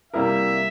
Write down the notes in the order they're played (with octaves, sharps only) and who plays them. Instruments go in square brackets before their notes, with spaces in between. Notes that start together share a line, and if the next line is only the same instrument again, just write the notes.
[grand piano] C3 G3 A#3 E4 A#4 [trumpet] E5